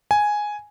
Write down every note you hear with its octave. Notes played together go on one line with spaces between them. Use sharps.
G#5